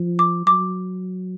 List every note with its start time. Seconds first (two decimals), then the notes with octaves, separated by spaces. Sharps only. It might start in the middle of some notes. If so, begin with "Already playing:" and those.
Already playing: F3
0.19 D6
0.46 F#3 D6